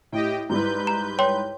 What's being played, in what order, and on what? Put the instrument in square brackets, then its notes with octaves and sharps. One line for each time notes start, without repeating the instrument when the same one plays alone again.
[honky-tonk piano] A2 [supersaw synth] G4 D#5 G5
[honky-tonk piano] G#2 G3 E4 [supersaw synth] B4 G6
[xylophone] A#5
C#5 G5 C6